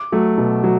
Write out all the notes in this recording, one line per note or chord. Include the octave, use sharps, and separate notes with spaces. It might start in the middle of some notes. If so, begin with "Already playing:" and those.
Already playing: D6
F#3 A3
B2
F#3